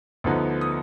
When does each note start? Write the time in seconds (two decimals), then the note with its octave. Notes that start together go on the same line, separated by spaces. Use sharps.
0.24 D2 D3 F3 B3 D#4
0.61 D#6